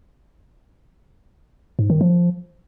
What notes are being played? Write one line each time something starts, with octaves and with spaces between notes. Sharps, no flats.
G#2
D#3
F3